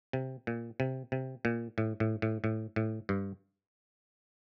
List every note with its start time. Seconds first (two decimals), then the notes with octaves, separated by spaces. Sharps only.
0.13 C3
0.47 A#2
0.80 C3
1.12 C3
1.45 A#2
1.78 A2
2.00 A2
2.22 A2
2.44 A2
2.76 A2
3.09 G2